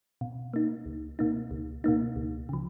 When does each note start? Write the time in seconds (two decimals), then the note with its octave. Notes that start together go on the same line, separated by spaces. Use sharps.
0.21 B2
0.54 A#3 D#4
0.86 C#2
1.19 B2 A#3 D#4
1.51 C#2
1.84 B2 A#3 D#4
2.16 C#2
2.49 C#3 F3